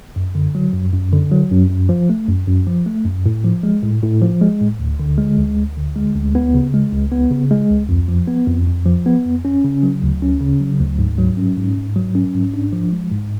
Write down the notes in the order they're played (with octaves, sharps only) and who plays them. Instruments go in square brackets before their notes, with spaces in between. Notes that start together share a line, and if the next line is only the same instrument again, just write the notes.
[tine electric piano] F#2
D3
F#3
F#2
F#2
D3
F#3
F#2
F#2
F3
A3
F#2
F#2
F3
A3
F#2
A2
F3
G#3
A2
A2
F3
G#3
A2
D2
D3
G#3
D2
D2
D3
G#3
D2
B3
C#3
G#3
C#2
B3
C#3
G#3
C#2
F2
F3
B3
F2
F2
F3
B3
F2
C#4
C#3
F#3
D2
C#4
C#3
F#3
D2
G#2
F#3
C#4
G#2
G#2
F#3
C#4
G#2
D4
F3
G#3
G#2